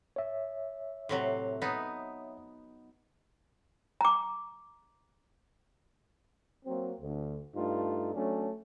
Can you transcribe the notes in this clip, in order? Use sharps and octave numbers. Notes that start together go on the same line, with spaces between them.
C#5 E5
A2 C3 F#3
B3 D#4
A#5 D6
F#3 A#3 C4
D2
G2 A3 D#4 F4
F#3 A3 C#4 D4